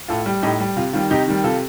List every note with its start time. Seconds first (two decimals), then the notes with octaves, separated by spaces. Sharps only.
0.08 A2 F4 A4
0.26 G3
0.42 A2 D#4 G4
0.60 G3
0.76 C3 F4
0.93 D#3 G3 F4
1.11 C3 D#4 G4
1.28 D#3 G3
1.44 C3 F4 A4